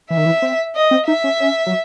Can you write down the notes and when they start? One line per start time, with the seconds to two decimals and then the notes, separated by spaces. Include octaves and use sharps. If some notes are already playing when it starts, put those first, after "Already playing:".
0.10 E3 E5
0.17 D#3
0.26 E3
0.42 C4
0.76 D#5
0.91 C4
1.07 D#4 E5
1.24 C#4
1.40 C#4
1.66 F#3